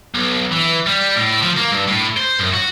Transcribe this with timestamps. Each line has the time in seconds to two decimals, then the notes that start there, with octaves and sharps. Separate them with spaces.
0.14 B1
0.52 E3
0.87 G3
1.17 A2
1.43 F3
1.57 A#3
1.72 G2
1.88 A2
2.17 C5
2.39 F#2
2.53 F#4